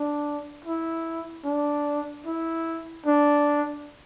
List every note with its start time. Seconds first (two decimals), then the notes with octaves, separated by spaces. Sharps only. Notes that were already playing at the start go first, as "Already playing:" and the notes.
Already playing: D4
0.65 E4
1.45 D4
2.26 E4
3.06 D4